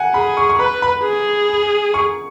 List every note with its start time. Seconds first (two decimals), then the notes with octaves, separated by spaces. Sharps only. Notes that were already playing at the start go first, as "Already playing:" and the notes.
Already playing: F#5 G#5
0.14 G#4 B5
0.37 C#6
0.49 C#6
0.59 B4 B5
0.82 B5
1.04 G#4
1.94 C#6